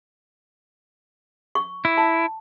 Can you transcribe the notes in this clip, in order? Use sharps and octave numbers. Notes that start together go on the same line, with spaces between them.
C#6
E4
A5